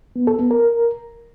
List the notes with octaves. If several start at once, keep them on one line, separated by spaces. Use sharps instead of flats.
B3
A4
B3
A#4